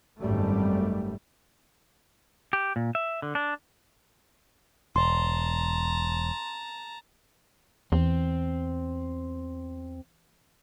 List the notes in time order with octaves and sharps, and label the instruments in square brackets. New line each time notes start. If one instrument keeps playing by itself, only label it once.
[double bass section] G#1 F#2 G3 A3
[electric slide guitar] G4
A#2
E5
D3
D4
[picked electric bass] E1 [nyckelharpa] A5 A#5 [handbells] C6
[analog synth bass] E2 [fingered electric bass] E3 [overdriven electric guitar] C4